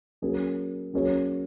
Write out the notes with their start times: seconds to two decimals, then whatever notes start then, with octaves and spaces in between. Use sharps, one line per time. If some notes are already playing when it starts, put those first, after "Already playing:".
0.22 F#3 A#3 C#4 G#4
0.94 F#3 A#3 C#4 G#4 C#5